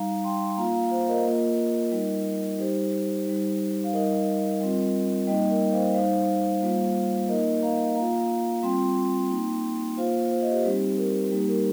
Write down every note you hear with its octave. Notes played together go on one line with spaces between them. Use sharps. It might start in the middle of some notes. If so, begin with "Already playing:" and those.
Already playing: G3 D#4 F5 A#5
G5 C6
A#3 F4 F5 A#5
F5 A#5
C5 F5
A#4 D#5
A#3 F4
G3 D#4
G3 D#4 G4 C5
G3 D#4
F5
G3 D#4 A#4 D#5
G3 C4 F4
G3 A#3 D#4 D#5 G5
A#4 D#5
C5 F5
G3 D#4 C5 F5
G3 A#3 F4
A#3 D#4 A#4 D#5
F5 A#5
A#3 F4 F5 A#5
G3 C4 F4 G5 C6
A#3 D#4
A#3 F4 C5 F5
C5
D#5
G4 C5
G3 C4 D#4 G4
A#4
G3 A#3 D#4 G4
A#4